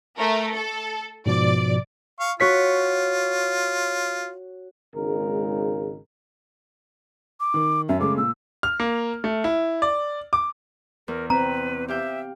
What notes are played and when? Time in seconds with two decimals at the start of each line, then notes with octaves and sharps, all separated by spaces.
0.17 A3 A#4
0.53 A4
1.26 G#2 B2 F3 D5
2.20 F5 C#6
2.40 F4 F#4 C#5 B6
4.95 G#1 G#2 C#3 G#3 A#4
7.40 D6
7.54 D#3
7.89 F#2 E5
8.00 C#3 G#3 A3 D6
8.17 A#2 E6
8.63 F6
8.80 A#3
9.24 A3
9.44 E4
9.82 D5
10.33 D6
11.08 E2 A#4
11.30 C4 B4 A#5
11.88 G4 E5 F5 G5